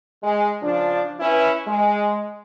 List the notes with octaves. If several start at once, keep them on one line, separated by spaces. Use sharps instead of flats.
G#3
C#3 F3 D4
C#4 E4 B4
G#3